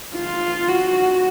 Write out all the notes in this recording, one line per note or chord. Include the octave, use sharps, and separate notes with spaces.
F4
F#4